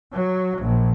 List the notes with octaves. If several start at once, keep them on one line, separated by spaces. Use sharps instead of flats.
F#3
A#1